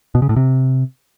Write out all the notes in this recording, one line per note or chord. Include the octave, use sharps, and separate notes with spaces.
B2
C#3
A2
C3